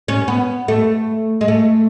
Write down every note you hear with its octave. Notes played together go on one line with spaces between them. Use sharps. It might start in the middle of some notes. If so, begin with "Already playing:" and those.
C#4
B3
A3
G#3
A3